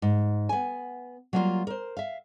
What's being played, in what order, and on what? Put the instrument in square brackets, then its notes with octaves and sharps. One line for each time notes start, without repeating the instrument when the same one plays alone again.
[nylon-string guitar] G#2
B3 G#5
F#3 G3 A#3 D#4 F4
A#4 C5
E5 F5